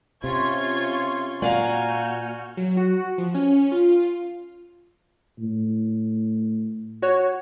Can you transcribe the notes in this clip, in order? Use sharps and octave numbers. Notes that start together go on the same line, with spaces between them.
C3 C#4 F4 C6 C#6 G#6
A#2 F#4 D5 F5 G#5 A#5 F6 G6
F#3
F#4
F3
C#4
F4
A2
F#4 C#5